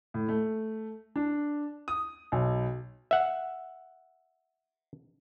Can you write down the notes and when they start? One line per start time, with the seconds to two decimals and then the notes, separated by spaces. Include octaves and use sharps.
0.14 A2
0.29 A3
1.16 D4
1.88 D#6
2.32 B1
3.11 E5 F#5